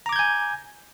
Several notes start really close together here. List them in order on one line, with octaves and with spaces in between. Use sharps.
A#5 D6 G#6 G6 G#5